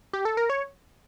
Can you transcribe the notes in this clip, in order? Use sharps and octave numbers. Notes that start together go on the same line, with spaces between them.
G4
A4
A#4
C#5